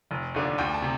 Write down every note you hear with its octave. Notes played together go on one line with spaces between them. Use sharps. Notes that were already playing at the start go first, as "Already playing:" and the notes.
F1
D#2 D3
D2 G5
A5
C3